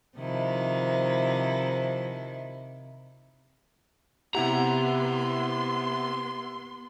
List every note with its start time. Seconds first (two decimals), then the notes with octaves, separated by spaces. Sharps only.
0.17 C3 D#3 F3 E4
4.35 C3 B3 E4 G4 F#5 A#5 C6